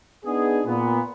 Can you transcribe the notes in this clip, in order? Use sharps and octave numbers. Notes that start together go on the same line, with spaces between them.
B3 D4 D#4 G#4
A#2 B3